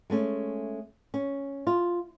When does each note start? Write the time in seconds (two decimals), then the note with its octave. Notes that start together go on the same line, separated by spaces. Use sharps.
0.10 G#3 A3 C#4
1.14 C#4
1.67 F4